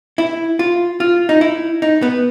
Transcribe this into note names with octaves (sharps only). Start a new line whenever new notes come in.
E4
F4
F4
D#4
E4
D#4
B3